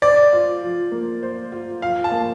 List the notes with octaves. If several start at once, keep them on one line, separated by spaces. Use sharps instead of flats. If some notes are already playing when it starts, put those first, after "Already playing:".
C5 D5
F4
F3
A#3
C5
F4
F3 F5
A5
A#3